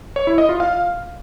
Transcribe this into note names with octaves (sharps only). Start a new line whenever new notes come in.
C#5
E4
D#5
F4
F5